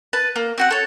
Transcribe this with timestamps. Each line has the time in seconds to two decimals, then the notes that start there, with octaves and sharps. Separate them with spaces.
0.13 B4 A5
0.36 A#3
0.58 C4 F#4 F#5
0.71 A4 C#5